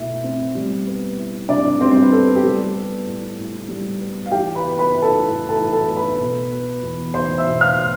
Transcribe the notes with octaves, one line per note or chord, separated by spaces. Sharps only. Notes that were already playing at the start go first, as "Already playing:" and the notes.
Already playing: B2 A3 E4
C4
G3
B3
E4
C3 D4 D5
G3 C4 C5
C5
B4
B3 A4
G4
G3 A4
B3
A2
A2
G3
B3
F5
E3 G4 G5
B4 B5
B3
B4 B5
E4
A4 A5
A2
A4 A5
E3
A4 A5
B3
B4 B5
B2
B3
E2
E2 C5 C6
E5 E6
B2
F5 F6
B3